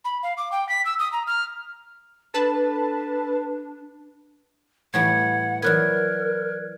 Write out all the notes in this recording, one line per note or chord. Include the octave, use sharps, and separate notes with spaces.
B5
F5
D6
G5
B6
E6
D#6
A#5
F6
D4 A4 B4 A5
A2 E3 G3 F#5 G#6
E3 F#3 B3 A#4 D5 F#6 G#6